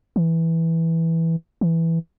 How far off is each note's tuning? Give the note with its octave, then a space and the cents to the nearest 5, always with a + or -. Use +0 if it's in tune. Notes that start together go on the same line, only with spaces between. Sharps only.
E3 -5
E3 +0